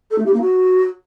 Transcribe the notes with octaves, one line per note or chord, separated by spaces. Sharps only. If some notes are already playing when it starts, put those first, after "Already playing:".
A4
A3
G4
A#3
F#4